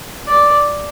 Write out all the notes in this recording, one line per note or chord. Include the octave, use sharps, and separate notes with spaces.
D5